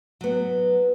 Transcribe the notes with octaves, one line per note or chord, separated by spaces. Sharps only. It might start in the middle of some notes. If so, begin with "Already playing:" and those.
F#3 B3